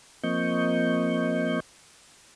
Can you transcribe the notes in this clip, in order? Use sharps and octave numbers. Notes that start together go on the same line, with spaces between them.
F3 A#3 C4 D#5 C#6 G6